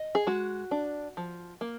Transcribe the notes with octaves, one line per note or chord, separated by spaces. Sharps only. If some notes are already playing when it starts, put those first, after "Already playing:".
Already playing: D#5
G#4
G#3 F#4
D4
F3
A#3